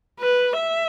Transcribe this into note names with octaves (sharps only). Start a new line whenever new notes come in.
B4
E5